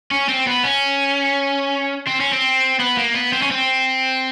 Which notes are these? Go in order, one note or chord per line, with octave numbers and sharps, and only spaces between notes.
C#4
C4
B3
C#4
C4
C#4
C4
B3
A#3
B3
C4
C#4
C4